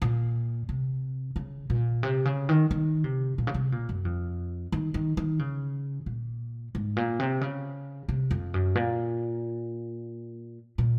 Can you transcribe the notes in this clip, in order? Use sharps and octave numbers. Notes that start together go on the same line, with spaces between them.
A#2
C3
C#3
A#2
C3
C#3
D#3
D#3
C3
A#2
C#3
C3
A#2
F#2
F2
D#3
D#3
D#3
C#3
A#2
G#2
A#2
C3
C#3
C3
F2
F#2
A#2
A#2